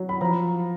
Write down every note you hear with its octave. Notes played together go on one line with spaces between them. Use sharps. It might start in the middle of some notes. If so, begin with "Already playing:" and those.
Already playing: F#3
B5
F3 A#5